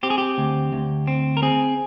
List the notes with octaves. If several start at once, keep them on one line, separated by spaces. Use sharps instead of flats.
C4 G4
G#4
G4
D2
D2
C4
A#4
C4 G#4